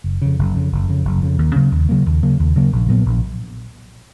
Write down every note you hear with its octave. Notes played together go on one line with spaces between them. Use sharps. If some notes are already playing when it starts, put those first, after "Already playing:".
F#1
F2 C#3
F#1
F2 C#3
F#1
F2 C#3
F#1
F2 C#3
D#2
C#3 F#3 A#3
D#2
C#3 F#3 A#3
D#2
C#3 F#3 A#3
D#2
C#3 F#3 A#3
A#1
A#2 F#3 B3
A#1